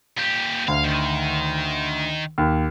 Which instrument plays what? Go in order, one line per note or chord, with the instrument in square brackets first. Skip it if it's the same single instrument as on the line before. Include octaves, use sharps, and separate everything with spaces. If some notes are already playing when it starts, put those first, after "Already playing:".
[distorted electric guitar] A#2 G4
[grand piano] D2 [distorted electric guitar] F5
[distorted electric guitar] D#3
[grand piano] D#2